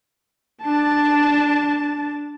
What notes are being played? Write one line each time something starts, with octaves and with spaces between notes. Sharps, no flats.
D4 A5